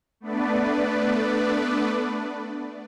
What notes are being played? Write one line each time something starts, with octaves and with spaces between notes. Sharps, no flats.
A3 B3 D4 B4 D5